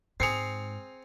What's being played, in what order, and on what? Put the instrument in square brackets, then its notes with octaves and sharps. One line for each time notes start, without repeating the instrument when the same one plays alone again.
[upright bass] G#2 [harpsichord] C4 G#4 [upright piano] C7 C#7 F7